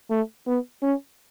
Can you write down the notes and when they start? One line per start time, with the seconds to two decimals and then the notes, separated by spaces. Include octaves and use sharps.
0.11 A3
0.47 B3
0.83 C#4